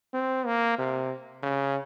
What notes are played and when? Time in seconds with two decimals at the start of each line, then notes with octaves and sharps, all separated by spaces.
0.14 C4
0.46 A#3
0.78 C3
1.43 C#3